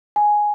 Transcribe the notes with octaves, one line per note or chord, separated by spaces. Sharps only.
G#5